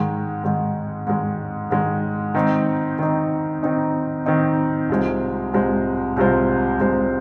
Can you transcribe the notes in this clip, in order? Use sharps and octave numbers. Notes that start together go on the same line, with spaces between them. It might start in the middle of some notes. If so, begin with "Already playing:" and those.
Already playing: G#2 D#3 G#3
G#2 D#3 G#3
G#2 D#3 G#3
G#2 D#3 G#3
D#3 C4 D#4
D#3 C4 D#4
D#3 C4 D#4
D#3 C4 D#4
C2 C3 G#3 F4 C5
C2 C3 G#3 F4 C5
C2 C3 G#3 F4 C5
C2 C3 G#3 F4 C5